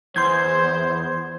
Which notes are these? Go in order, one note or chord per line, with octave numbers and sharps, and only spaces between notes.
E2 C5 C6 G6 G#6